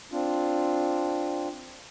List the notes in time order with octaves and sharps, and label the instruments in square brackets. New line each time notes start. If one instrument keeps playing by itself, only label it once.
[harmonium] C4 D4 F4